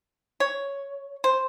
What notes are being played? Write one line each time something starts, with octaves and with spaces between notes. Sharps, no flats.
C#5
C5